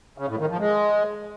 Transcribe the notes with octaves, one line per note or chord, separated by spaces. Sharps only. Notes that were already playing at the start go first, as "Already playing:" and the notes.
C#3
A2
D#3
F3
G#3